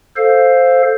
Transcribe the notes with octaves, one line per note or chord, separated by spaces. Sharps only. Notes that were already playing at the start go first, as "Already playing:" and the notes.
A4 C5 F5